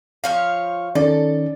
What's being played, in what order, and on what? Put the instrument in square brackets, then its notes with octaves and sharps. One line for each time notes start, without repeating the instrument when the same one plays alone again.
[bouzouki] F3 C#5 F5
[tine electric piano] D#3 C#4 D#4 [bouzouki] A4 [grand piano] D5